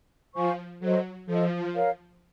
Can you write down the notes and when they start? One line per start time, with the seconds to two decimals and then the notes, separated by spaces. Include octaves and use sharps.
0.34 F3 C5 F5 G#5 C#6
0.80 F#3 A4 C5 D#5
1.27 F3 A4 C5 D#5
1.73 A#4 C#5 F5